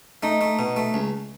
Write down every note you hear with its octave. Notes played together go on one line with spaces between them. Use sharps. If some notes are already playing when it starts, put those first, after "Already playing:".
A3 D#4
A3
B2
A3
C#2